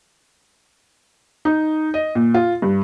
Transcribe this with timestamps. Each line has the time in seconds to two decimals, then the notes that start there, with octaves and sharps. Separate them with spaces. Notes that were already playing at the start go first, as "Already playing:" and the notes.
1.45 D#4
1.94 D#5
2.15 A#2
2.34 F4
2.62 G2